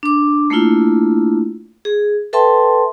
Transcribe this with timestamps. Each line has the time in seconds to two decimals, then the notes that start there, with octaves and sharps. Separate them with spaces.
0.03 D4 D6
0.50 A3 A#3 D4 E4 F4
1.85 G#4
2.33 A4 B4 E5 G5 A5 C6